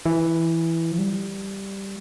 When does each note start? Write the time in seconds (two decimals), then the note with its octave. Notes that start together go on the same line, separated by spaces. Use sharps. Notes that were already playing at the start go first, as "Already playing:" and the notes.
0.06 E3
0.92 F3
0.99 G3